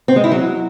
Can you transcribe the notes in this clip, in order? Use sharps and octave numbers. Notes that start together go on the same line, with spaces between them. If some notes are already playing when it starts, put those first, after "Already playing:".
C4
G#3
E4
F#3